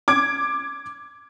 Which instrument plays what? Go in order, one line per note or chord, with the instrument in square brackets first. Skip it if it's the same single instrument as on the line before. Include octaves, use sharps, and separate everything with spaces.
[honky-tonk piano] D6 G#6 D7